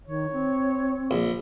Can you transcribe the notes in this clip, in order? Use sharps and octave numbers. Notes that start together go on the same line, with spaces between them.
D#3 C#5
C4
A#1